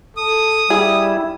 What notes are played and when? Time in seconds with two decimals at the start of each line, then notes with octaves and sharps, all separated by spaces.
0.17 A4 D#6
0.70 G3 E4 G#4